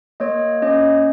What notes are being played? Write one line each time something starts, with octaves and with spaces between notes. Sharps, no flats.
A#3 C#5 D#5
C#4 C#5 D#5